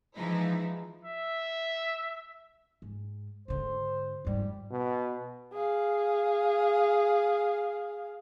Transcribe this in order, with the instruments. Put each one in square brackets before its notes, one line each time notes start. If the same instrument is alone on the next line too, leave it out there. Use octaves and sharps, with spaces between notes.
[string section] E3 F3 G#3 D#4 E4
[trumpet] E5
[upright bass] G#2
[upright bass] G#2 D3 [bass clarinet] C5
[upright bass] F2 G#2 [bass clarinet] G3
[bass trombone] B2
[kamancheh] G#4 F5